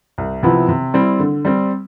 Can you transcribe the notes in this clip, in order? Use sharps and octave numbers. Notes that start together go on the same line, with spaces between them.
C2
C3 F3 B3 E4
C3
G3 C4 E4
D3
G3 C4